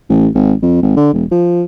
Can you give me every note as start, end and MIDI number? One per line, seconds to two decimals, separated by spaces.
0.09 0.27 33
0.35 0.52 32
0.62 0.77 41
0.82 0.96 32
0.97 1.13 50
1.13 1.24 28
1.31 1.63 53